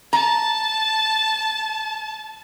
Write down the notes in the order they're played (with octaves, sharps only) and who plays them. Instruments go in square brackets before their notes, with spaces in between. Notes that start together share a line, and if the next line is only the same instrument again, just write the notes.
[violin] A5 [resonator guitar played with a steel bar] A#5